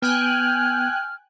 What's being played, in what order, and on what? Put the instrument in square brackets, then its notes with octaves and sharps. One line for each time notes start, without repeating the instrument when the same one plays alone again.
[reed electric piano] B3 [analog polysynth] G5 G#5 F#6 [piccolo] F6